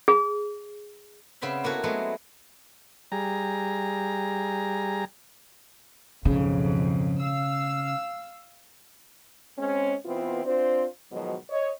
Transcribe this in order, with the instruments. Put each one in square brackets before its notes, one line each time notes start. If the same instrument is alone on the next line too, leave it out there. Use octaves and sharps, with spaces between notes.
[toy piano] G#4
[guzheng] C#3 B3 C4 E5 B5
A#3 B3 E4 F#4 A4
F#3 G#3 A3 B3 C4
[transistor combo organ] G3 G#4 A#5
[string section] B1 F2 G#2 [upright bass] C#3
[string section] F5 E6
[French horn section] G#3 C4 C#4
B2 E3 B3 C4 E4 F4
C4 D4 F4 C5
G#2 B2 D#3 F3 F#3
C#5 D#5